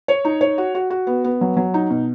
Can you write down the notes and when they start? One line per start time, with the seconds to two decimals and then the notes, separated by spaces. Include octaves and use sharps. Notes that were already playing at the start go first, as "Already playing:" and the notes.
0.08 C#5
0.25 D#4
0.41 C#5
0.58 F#4
0.75 F#4
0.90 F#4
1.07 B3
1.24 B3
1.41 F#3
1.57 F#3
1.74 D#4
1.90 B2